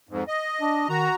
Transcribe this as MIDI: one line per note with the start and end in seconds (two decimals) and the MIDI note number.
0.09 0.24 41
0.09 0.24 44
0.28 0.88 75
0.61 0.85 62
0.89 1.08 51
0.89 1.15 66
0.89 1.15 82